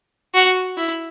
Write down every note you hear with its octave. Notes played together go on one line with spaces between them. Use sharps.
F#4
E4